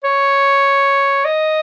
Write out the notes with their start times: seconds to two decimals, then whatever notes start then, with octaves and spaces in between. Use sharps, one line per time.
0.04 C#5
1.25 D#5